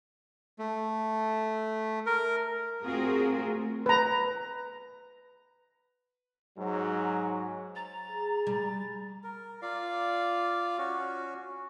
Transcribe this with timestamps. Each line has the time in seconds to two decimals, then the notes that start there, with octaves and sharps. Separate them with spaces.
0.59 A3
2.06 A#4
2.82 A3 C4 F4 F#4 G#4 A#4
3.86 B4 A#5
6.58 G#2 F#3
7.76 A#5 A6
8.09 G#4
8.47 G3
9.23 A#4
9.62 F4 D5 F5
10.78 C#4 F#4